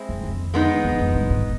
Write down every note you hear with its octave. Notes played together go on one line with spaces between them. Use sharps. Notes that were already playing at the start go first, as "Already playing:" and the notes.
Already playing: G#3 C4 E4
F#2
F2
G#3 B3 D#4
E2
F2
G2
G#2